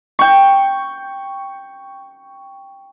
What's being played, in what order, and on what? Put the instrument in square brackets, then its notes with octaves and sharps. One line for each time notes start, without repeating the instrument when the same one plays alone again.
[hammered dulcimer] G5 C#6